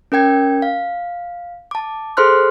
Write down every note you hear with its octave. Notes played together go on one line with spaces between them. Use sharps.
C#4 A#4 G5 G#6
F5
A5 D6
G#4 A4 C5 C6 F6 F#6